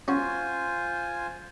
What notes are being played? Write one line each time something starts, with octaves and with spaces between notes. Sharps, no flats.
C#4 F4 F#4 C5 G#5